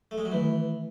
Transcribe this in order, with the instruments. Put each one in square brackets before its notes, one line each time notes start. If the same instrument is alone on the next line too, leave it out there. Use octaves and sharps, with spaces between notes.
[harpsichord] A3
G#3
F#3
[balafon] D#3 A3 E4 B4 [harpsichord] E3